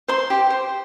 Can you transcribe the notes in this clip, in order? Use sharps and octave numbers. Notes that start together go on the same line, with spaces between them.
C5 C6
G4
C5